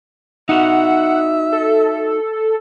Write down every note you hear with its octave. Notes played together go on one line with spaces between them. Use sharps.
D#4 F#4 E5 F#5
A4